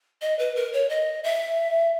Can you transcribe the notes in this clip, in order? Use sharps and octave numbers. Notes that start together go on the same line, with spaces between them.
D#5
B4
A#4
C#5
D#5
E5